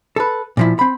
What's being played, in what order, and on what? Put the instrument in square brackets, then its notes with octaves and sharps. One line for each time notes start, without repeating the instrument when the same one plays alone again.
[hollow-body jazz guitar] A4 B4
A#2 F3 E4
C4 B5